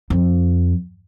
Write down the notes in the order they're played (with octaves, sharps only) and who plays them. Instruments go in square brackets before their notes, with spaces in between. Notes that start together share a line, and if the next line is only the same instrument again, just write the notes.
[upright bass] F2